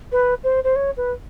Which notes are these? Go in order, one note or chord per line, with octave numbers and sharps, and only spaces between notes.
B4
C5
C5
C#5
B4